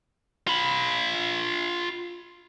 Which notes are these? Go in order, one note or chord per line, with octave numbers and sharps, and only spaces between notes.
F4 B5